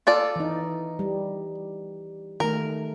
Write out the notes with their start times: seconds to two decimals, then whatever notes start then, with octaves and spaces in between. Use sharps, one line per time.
0.07 F4 A4 D5
0.36 E3 D#4
0.99 G3
2.40 D#3 A3 A#4